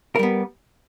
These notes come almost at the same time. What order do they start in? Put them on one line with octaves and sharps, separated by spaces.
A#4 G3 B3